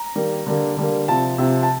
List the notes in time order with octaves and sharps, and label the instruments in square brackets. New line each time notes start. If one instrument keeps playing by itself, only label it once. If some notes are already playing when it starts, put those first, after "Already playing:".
Already playing: [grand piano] A#5
D#3 G3 A#3
D3 G3 A#3
D3 G3 A#3
C3 F3 C4 A5
C3 F3 C4
A5